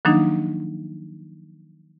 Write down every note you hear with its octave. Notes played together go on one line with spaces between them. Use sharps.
D#3 F3 F#3 A#3 D4 D#4